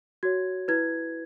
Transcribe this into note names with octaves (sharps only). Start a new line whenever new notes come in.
F#4 C#5 G#6
E4 B4 G#6